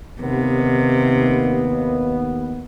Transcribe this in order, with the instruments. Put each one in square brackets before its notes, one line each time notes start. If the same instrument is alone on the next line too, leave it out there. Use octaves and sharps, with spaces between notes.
[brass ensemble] D#2 B3 [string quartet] C3